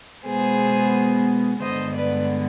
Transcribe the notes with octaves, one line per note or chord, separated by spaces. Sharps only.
B2 G#3 B3 G#4 C5
G2 D3 G#3 B3 C5 D#5
B4 D5